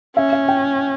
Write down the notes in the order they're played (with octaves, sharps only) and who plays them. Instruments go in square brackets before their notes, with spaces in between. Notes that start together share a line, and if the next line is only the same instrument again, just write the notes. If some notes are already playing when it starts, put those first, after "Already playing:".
[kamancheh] C#4 [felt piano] E5
[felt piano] E5
G5